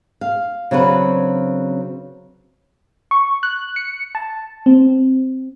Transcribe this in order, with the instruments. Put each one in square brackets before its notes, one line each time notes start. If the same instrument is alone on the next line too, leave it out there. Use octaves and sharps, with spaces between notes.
[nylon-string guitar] F5
C#3 F#3 C4 D4 B4
[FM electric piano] C#6
F#6
C#7
A5
C4